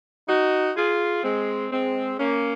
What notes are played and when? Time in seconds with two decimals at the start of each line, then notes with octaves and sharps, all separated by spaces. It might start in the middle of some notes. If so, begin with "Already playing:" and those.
0.28 D#4 F#4
0.76 F4 G#4
1.23 G#3 C4
1.71 G#3 C4
2.19 A#3 C#4